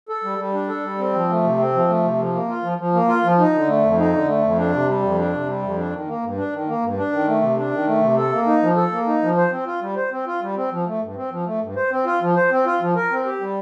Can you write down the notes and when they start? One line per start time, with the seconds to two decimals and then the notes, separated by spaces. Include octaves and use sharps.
0.09 A4
0.24 G3
0.38 G3
0.53 D4
0.69 A4
0.84 G3
0.98 C4
1.13 F3
1.29 A3
1.43 C3
1.58 C4
1.74 F3
1.88 A3
2.04 C3
2.18 F3
2.33 A#3
2.48 F4
2.63 F3
2.78 F3
2.93 A#3
3.08 F4
3.23 F3
3.39 D#4
3.54 D3
3.68 A3
3.83 F2
3.98 D#4
4.13 D3
4.28 A3
4.43 F2
4.57 D4
4.72 C3
4.88 G3
5.03 F2
5.18 D4
5.33 C3
5.47 G3
5.63 F2
5.77 D4
5.92 D#3
6.07 A#3
6.23 G2
6.37 D4
6.53 D#3
6.67 A#3
6.82 G2
6.98 D4
7.12 D#3
7.27 A3
7.42 C3
7.57 D4
7.72 D#3
7.87 A3
8.02 C3
8.17 A4
8.32 A#3
8.46 D#4
8.62 F3
8.77 A4
8.92 A#3
9.07 D#4
9.22 F3
9.37 C5
9.51 C4
9.66 F4
9.81 G3
9.96 C5
10.11 C4
10.27 F4
10.42 G3
10.56 C4
10.71 F3
10.87 A3
11.01 G2
11.16 C4
11.31 F3
11.46 A3
11.61 G2
11.76 C5
11.91 C4
12.05 F4
12.21 F3
12.36 C5
12.51 C4
12.66 F4
12.80 F3
12.96 A#4
13.11 C4
13.26 G4
13.41 G3